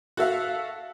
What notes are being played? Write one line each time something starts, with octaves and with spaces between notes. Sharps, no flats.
F#4 A4 E5 F5